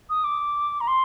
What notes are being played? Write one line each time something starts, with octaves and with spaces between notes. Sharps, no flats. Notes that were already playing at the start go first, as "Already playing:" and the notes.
D#6
D6
A#5
C6